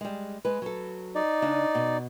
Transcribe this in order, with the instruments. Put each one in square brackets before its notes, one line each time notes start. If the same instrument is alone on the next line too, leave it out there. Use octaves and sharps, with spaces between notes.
[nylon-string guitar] G3 G#3
G#3 B4
F#3 A4
[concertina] D#4 D5
[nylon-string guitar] C#3 D4 D#5
B2